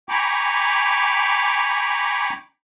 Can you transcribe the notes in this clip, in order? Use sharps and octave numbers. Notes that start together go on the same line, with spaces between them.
G5 G#5 A#5 B5 C#6 D6